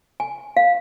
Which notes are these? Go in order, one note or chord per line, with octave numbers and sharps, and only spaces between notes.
G#5
F5